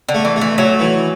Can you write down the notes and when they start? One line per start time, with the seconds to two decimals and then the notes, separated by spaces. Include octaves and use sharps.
0.09 D3
0.14 A3
0.25 E3
0.36 A3
0.41 E3
0.58 F#3 A3
0.79 E3